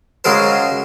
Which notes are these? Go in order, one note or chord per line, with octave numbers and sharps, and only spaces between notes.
C#3 F#3 G#3 A#4 C5